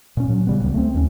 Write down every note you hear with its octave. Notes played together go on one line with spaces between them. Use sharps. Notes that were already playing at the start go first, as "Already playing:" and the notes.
A#2 C#4
F#3
C#3 G3 B3
D1 C#2
A3 C4
D#2 C#4